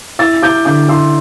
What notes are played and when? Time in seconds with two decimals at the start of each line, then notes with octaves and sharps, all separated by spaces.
0.19 E4 E6 A6
0.42 E4 D6 G6
0.65 D3 D6 G6
0.89 E4 C6 E6